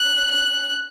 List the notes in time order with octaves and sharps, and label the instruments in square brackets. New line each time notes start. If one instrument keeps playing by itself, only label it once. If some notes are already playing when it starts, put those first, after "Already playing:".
Already playing: [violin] F#6
F#6